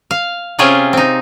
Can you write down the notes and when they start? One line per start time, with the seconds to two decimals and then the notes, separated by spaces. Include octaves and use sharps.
0.11 F5
0.59 C3 C#4 F4 G#4 E5 G5
0.93 C4 D#4